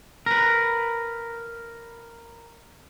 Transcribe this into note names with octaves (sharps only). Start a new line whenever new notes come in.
A#4 B4